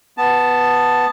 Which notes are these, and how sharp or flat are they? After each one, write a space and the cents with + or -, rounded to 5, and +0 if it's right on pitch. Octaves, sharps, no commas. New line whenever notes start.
B3 +0 A5 +0